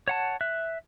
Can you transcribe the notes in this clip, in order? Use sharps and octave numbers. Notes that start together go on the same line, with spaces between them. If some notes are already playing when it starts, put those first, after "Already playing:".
C#5 F#5 A5
E5 F#6